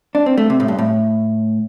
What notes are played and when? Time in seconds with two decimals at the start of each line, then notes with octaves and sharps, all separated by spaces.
0.15 D4
0.26 C4
0.38 A3
0.50 C3
0.60 A2
0.68 G2
0.79 A2